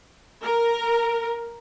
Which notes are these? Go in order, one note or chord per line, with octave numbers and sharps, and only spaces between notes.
A#4